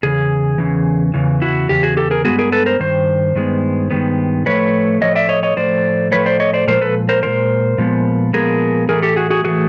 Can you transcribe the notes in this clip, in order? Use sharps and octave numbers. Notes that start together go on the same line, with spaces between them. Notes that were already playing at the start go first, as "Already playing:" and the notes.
E2 C#3 G#4
E2 C#3 E3
E2 C#3 E3
E4 F#4
E2 C#3 G4
F#4 G#4
G4 A4
G#4 A#4
G2 D#3 G#3 B3 F#4 G#4
G#4 A#4
A4 B4
A#4 C5
G2 D#3 C5
G2 D#3 G#3 B3
G2 D#3 G#3 B3
A2 F3 A3 B4 C#5
A2 F3 A3 C#5 D#5
D5 E5
C#5 D#5
C#5 D#5
A2 F3 A3 C5 D5
A2 F3 A3 B4 C#5
C5 D5
C#5 D#5
C5 D5
A#2 F3 G#3 A#4 C5
A4 B4
A#4 C5
A#2 F3 G#3 A#4 C5
A#2 F3 G#3 B3
A#2 F3 G#3 B3 G#4 A#4
A2 E3 A3 G#4 A#4
G4 A4
F#4 G#4
F#4 G#4
A2 E3 A3 F#4 G#4